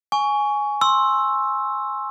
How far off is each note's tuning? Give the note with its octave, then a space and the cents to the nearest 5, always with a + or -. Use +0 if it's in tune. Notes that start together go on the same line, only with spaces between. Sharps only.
G#5 +5 C#6 +20
C6 +20 E6 +0